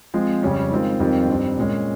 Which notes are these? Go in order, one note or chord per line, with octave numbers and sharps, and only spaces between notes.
F3 G#3 C4
F2 C#3 G3 C#4
D#3 G#3 C4 F4
F2 D#3 G3 C4 F4
G2 D#3 G3 C4
A#2 G#3 C#4